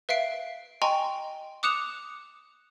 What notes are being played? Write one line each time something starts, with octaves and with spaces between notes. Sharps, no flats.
B4 E5 F5 C7 D7
D#5 G5 G#5 A#5 C6 C#6
D6 D#6 F#6 C#7 E7 F7